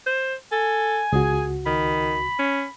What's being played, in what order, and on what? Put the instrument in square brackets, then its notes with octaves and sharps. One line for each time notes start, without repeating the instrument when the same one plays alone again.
[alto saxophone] C5
[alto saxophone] A4 [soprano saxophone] G#5
[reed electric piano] C#2 F#4 [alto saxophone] G#4
[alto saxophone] D#3 [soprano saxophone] B5
[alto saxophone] C#4